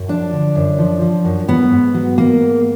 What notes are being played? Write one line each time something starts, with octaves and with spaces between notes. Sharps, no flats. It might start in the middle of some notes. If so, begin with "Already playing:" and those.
Already playing: F#2
F3 D4
D3
F#2
F3
F3
F#2
G#2 B3
G#2
F#3
G#2 A#3
G#2